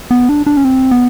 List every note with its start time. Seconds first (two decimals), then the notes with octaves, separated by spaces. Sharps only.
0.11 B3
0.29 D4
0.47 D4
0.57 C#4
0.65 C4
0.91 B3